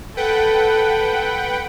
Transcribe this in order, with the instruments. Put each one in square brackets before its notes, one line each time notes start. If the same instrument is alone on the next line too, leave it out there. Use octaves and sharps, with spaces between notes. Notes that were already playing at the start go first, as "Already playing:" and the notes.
[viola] A4 [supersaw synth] B4 F#5 G5